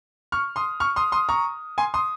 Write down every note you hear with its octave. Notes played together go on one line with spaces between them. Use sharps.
C#6 F6
C6 D#6
C#6 F6
C6 D#6
C6 D#6
A#5 C#6
G#5 C6
C6 D#6